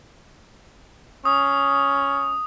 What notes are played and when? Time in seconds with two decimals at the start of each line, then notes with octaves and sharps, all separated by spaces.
1.25 C#4 D#6